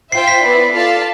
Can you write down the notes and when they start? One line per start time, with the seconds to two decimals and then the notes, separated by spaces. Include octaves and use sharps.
0.12 F4 C5 E5 G5 C7
0.28 B6
0.42 B3 E4 B4 D5
0.71 F4 A4 D5 F5 A5